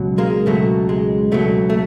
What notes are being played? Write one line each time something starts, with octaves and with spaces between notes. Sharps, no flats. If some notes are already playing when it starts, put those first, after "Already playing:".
Already playing: C#2 B2 F#3
G#3 A#3
C#2 B2 F#3 A3
G#3
C#2 B2 F#3 A3
A3